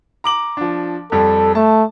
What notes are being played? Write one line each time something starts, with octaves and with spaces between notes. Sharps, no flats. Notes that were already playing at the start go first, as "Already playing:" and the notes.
A#5 D6 F#7
F3 D4
F2 G3 A4
A3 A5